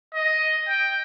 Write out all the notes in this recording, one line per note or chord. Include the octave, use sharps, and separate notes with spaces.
D#5
G5